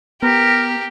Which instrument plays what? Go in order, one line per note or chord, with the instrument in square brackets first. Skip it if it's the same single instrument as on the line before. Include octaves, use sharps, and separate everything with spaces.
[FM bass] B3 [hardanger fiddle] G4 [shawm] A#4